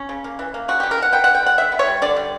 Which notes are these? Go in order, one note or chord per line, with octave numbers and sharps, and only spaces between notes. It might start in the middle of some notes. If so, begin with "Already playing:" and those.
Already playing: C#4
C#3
A#3
E3
A#3
C#3 F#4
C#3 G4
A#4
E3 F#5
B3 G5
D3 F#5
G5
G3 F#5
D3 E5
B3
C#5
G3
D3 D5
G3